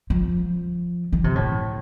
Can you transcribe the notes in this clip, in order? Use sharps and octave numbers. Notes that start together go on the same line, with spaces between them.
F3
E3
C3
A2